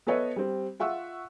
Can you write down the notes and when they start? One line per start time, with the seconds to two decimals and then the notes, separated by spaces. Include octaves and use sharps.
0.07 B3 A4 B4 C#5 D#5 E5
0.36 G3 C4
0.79 F4 E5 F#5 C#6 E6